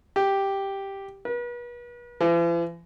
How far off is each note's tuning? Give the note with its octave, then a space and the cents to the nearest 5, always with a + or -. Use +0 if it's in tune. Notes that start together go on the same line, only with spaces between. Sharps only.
G4 +0
B4 -40
E3 +45